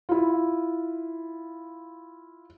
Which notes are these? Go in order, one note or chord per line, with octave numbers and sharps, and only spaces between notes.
E4 F4